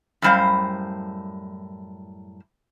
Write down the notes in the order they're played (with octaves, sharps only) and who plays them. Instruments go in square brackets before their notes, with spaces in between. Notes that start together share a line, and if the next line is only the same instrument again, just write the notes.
[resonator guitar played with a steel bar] F#2 A2 G3 C5 F5